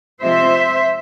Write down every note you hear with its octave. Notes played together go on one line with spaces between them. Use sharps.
C3 F3 G#3 C4 C5 E5